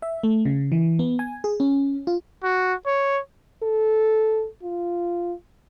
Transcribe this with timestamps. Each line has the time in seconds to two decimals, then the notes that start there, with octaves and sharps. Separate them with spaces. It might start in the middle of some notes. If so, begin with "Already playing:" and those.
0.02 E5
0.23 A3
0.45 C#3
0.72 E3
0.99 B3
1.19 G#5
1.44 G#4
1.60 C#4
2.07 F4
2.44 F#4
2.86 C#5
3.63 A4
4.63 F4